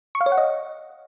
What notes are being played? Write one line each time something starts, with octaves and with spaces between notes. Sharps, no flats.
C#6
F5
C#5
F#5
D#5